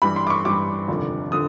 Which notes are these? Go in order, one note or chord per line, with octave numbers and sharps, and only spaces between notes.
G2 E3 G3 B5
C6
D6
C#6
G2 E3 G3 D6
F1 D#2 D3 F3
D3 F3 D#6